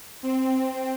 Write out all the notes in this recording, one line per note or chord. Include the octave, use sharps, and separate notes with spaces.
C4